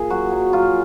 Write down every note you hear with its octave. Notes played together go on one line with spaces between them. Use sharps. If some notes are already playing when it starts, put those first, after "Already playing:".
Already playing: A#2 G#4
F#3 F#4
F#3
F#3 F4